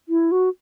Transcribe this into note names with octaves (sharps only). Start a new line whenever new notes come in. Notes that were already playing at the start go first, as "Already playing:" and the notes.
E4
F#4